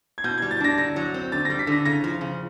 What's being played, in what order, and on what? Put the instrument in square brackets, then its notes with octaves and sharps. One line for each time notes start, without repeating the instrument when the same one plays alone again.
[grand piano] G#6
[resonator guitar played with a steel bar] B2 [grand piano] G6
[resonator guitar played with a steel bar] G3 [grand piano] G#6
[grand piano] A6
[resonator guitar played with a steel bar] D4 [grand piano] A#6
[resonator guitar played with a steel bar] D3 [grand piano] A#6
[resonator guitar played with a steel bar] F#3
C4
[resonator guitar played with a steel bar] D3 [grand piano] A6
[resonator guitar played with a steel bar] G3 [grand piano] A#6
[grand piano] B6
[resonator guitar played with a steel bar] D3 [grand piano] A#6
[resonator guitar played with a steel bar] C#3 [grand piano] A#6
[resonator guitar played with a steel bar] F3
C#3